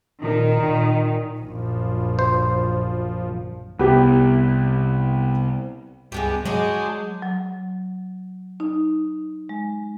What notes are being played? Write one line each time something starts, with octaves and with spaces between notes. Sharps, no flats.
A#2 D#3
A#2
A#1 F#2 F3
C5
C2 B3 G4
C#2 G2 G#3 B3 G4
F#3 G#3 D4 D#4 F#4 G#4
F#3
D#4
G#3